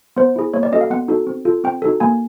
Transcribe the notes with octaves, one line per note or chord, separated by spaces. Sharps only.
B3 C5
E4 G#4
A#3 C#5
D5
C#4 F#4 A4 D#5
F5
B3 F#5
D#4 F#4 A4
C4
F4 A4
C4 G5
D#4 F#4 A4
A#3 G#5